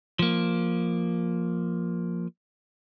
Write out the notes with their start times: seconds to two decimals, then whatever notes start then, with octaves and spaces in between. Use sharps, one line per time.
0.19 F3 A#3